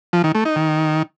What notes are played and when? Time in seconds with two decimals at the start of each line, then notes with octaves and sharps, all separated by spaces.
0.13 F3
0.24 D#3
0.35 A3
0.45 D#4
0.56 D#3